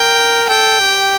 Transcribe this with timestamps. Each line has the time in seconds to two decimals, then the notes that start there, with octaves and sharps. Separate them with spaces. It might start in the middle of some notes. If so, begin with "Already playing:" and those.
Already playing: A#4 G5
0.49 A4 G5
0.81 G4